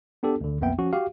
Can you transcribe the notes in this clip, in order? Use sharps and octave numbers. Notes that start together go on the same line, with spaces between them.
B3 D4 G4 A4
D2 D3
B1 F2 A#3 B3 E5 G5
F3 C#4 F#4
F#4 G4 F5